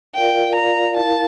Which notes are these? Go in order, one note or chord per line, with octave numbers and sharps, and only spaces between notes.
F4 A#4 D5 F5 G5
F4 A#4 D5 F5 A#5
E4 A#4 F5 A5